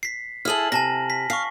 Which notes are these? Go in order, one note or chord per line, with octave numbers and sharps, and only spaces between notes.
B6 C7
E4 G#4 A4 F6 F#7
C3 G#5 A5 A#6
B6
F5 C#6 C7